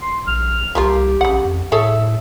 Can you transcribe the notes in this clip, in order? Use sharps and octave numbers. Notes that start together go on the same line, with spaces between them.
C6
A#1 F6
C2 F3 A#3 F4 G4
A#1 C#3 F#5
F2
A2 G#4 A4 C#5 E5